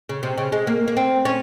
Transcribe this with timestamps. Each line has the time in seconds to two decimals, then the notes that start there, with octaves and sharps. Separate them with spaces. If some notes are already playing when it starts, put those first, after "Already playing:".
0.09 C#3
0.23 C3
0.38 C#3
0.52 G#3
0.67 A#3
0.88 A#3
0.97 C4
1.25 C#4